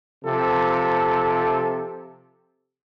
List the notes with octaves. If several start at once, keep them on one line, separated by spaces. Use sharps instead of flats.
C3 F3 A4